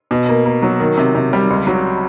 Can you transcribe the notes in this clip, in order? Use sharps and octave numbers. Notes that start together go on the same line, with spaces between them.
B2
A#3
A#3
F#3
D#3
C3
C3
G3
C#2
F#3